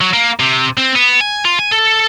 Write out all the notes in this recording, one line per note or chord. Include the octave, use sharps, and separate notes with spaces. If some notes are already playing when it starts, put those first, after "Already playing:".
F#3
A#3
C3
C4
B3
G#5
F4
G#5
A4